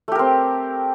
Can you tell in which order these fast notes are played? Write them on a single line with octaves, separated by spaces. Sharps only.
A3 G4 A#4 C4